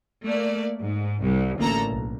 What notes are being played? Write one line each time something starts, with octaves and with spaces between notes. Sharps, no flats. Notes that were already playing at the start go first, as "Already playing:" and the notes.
A3 A#3 D5
G#2
C2
A1 D2 A#3 A4 A#5
B1